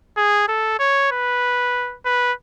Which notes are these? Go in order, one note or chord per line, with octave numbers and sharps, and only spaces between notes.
G#4
A4
C#5
B4
B4